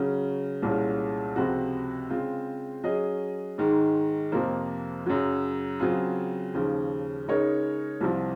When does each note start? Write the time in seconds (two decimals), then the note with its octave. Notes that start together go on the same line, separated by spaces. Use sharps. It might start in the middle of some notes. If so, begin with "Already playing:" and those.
Already playing: C#3 F#3 C#4
0.62 C2 A#2 G#3 C#4
1.36 C#2 C3 F3 C4 F#4
2.10 C#3 G#3 C4 F4 C5
2.84 F#3 C#4 G#4 D#5
3.58 G#2 D#3 G#3
4.32 F2 C3 F3 A#3
5.06 F#2 C#3 F#3
5.80 C#3 F#3 C4 F4 G#4
6.54 D#2 C#3 F3
7.28 C#3 G#3 D#4 A#4 C#5
8.01 C2 C3 F3